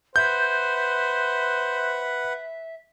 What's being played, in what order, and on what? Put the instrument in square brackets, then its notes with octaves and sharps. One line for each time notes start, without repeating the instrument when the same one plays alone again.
[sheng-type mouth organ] B4 F#5 [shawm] C5 [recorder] E5 [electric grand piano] G6